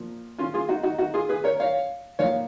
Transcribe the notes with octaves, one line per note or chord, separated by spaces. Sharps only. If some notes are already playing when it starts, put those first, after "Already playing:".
Already playing: A#2 F3
C#4 F4
F4 G#4
D#4 F#4
D#4 F#4
D#4 F#4
F4 G#4
G#4 B4
A#4 C#5
C#5 F5
A#2 F3 C#5 F5